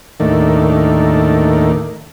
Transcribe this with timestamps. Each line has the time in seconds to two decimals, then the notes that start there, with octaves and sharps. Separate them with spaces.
0.20 D#2 A2 D#3 A3 A#3 D4